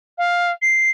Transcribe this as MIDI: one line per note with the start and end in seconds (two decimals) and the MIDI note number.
0.18 0.52 77
0.62 0.91 96